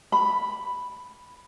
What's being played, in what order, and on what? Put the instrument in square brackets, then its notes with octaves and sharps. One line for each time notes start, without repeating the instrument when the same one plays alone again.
[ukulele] B5